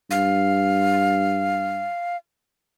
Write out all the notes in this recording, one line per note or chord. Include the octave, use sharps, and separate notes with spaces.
G2 F5